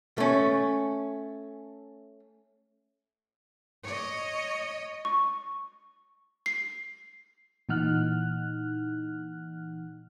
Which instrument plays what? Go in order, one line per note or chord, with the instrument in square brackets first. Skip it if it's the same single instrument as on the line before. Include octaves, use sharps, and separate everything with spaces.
[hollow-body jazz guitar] A3 C#4
[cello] C#5 D#5
[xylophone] C#6
C7
[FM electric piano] A#2 E3 D#4 F#5 F6 F#6